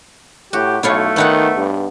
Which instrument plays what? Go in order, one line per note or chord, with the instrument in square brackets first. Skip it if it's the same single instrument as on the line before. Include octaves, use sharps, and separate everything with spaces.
[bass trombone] A2 [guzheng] F#4 [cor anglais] G4
[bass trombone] B1 [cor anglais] A3 [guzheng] E4 F4 C#5
[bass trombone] D#3 [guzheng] B3 D#4 F#5
[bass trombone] G2